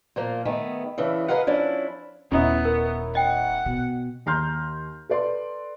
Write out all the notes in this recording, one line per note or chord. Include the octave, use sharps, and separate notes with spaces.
A#2 F3 A#3
D#3 A3 B3 G#4
C#3 E3 D4 A4
G#4 A#4 B4 D#5 F5 F#5
F3 C#4 D4 E4
D#1 B3 C#4 D#4 E4
A#4
D#5 F#5 G5
B2
D#2 A#5 C6 F6 G6
A4 B4 D5 C6